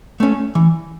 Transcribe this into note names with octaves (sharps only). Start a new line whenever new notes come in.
A3 C#4
E3